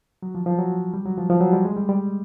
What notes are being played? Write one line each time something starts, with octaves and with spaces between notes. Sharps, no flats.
F#3
F3
F3
F#3
G3
F#3
F3
F3
F#3
G3
G#3
G3
G3